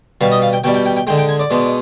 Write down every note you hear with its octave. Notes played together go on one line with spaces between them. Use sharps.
B2 G3 F5
D#5
F5
G5
B2 G3 G5
G5
G5
G5
D3 G#3 G5
G5
G#5
D5
B2 G#3